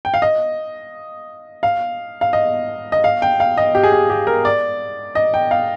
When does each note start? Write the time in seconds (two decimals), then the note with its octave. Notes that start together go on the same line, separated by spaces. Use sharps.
0.05 G5
0.14 F5
0.22 D#5
1.63 F5
2.21 F5
2.33 D#5
2.92 D#5
3.04 F5
3.22 G5
3.40 F5
3.57 D#5
3.75 G4
3.83 G#4
3.92 G4
4.10 G4
4.27 A#4
4.45 D5
5.15 D#5
5.34 G5
5.51 F5